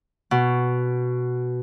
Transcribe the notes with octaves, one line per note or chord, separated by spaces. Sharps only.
B2